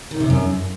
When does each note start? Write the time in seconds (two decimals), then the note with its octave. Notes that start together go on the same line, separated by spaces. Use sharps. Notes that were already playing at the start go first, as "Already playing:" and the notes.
0.11 D#3
0.20 C3
0.30 F#2